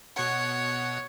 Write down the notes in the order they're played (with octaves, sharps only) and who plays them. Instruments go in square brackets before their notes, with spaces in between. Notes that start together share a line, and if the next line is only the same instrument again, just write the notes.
[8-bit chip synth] B2 F#5 [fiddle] C#5